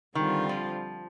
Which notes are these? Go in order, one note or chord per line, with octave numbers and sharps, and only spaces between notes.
D3 D#3 G3 C4 F4
F3